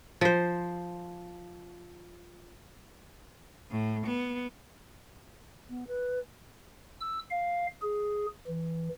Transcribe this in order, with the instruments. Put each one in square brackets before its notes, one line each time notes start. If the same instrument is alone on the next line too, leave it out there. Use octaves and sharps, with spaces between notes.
[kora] F3 C5
[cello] A2
B3
[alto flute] B3
B4
[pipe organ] E6
F5
G#4
E3